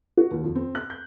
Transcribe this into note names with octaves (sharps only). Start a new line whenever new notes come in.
F#4
D#2
F2
C4
F#6
G6